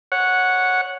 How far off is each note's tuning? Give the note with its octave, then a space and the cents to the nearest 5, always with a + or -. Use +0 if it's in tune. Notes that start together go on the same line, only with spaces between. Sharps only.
C#5 +0 F#5 -10